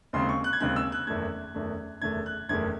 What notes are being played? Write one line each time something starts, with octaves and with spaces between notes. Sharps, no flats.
D#2 C#3 G#3 C4 C6
C#6
F#6
G#6
D#2 C#3 G#3 C4 F#6
E6
F#6
F#1 E2 D#3 A3 G#6
F#1 E2 D#3 A3
F#1 E2 D#3 A3 G#6
F#6
F#1 E2 D#3 A3 G#6